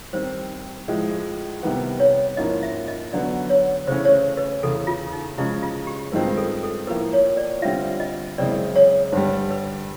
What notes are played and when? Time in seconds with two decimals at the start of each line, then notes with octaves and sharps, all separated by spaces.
0.13 D#3 G3 C4 C5
0.88 A2 F3 G#3
1.63 C3 D#3 G3 B3
2.00 C#5
2.37 G#2 F3 A#3 C#4 E4 D#5
2.63 E5
2.88 D#5
3.13 D3 F#3 B3 D5
3.50 C#5
3.87 C#3 E3 A3 C#4 C5
4.05 C#5
4.13 C5
4.37 B4
4.62 E2 C#3 E3 A4
4.87 F4
5.13 D#4
5.38 C#3 F3 G#3 C#4 E4
5.63 F4
5.87 G4
6.12 G2 D#3 G#3 C4 F4 B4
6.37 A4
6.63 A4
6.87 A2 F3 A#3 B4
7.13 C#5
7.37 D5
7.62 D3 G3 C4 F4 E5
8.00 D#5
8.38 F#2 C#3 E3 G#3 C4 D5
8.76 C#5
9.12 G2 D3 G3 C5
9.51 B4